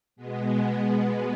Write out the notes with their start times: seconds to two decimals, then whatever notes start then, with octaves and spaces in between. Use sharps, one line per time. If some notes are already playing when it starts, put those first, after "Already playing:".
0.16 B2 G#3 B3